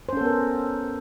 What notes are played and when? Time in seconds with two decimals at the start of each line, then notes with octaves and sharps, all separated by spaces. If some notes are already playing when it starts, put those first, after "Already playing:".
0.09 C5
0.13 C#4
0.17 A4
0.21 B3
0.25 A#4